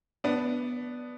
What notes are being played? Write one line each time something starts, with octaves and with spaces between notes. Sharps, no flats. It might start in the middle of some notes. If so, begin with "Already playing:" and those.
B3 D4